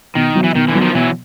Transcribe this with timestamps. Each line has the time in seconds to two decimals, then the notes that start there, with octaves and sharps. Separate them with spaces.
0.15 B2 D#3
0.35 F#3 B3
0.44 E3
0.55 B2 D#3
0.68 D3 E3
0.75 F#3 B3
0.81 D#3 F3
0.95 B2 E3 F#3